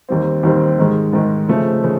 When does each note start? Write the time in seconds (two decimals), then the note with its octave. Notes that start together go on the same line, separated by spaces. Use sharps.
0.09 D#2 D#3 G3 C4
0.43 D#2 D#3 G3 C4
0.79 G#2 D#3 G#3
1.13 G#2 D#3 G#3
1.48 C#3 F3 A3 C4
1.84 C#3